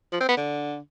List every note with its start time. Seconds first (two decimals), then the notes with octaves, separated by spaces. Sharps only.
0.12 F3
0.20 C4
0.28 B3
0.37 D3